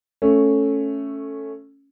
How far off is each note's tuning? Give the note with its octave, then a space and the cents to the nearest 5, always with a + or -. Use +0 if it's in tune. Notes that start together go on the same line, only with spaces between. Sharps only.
A3 +0 C#4 +0